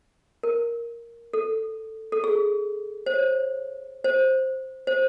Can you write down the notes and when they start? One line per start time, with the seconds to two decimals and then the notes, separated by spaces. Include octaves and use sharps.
0.43 A#4
1.34 A4
2.12 A4
2.24 G#4
3.06 C5
3.14 C#5
4.04 C5
4.87 C5